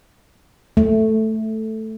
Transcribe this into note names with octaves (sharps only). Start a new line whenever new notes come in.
A3